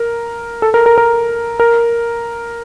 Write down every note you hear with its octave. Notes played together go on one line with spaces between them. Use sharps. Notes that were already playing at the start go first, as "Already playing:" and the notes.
Already playing: A#4
A4
A#4
A#4
A#4
A#4